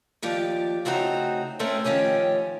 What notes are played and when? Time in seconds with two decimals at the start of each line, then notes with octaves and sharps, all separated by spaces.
0.22 D#2 F3 G4 D5
0.85 C#3 A3 C4 D#4 F#4 A#5
1.59 A3 C4 C#4 A4 A#4
1.84 D#3 F3 A3 C#4 G4